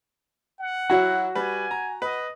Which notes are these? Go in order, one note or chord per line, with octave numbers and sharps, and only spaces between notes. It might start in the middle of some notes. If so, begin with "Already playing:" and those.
F#5
F#3 E4 F#4 C#5
G3 B4 G#5
A#5
B4 D#5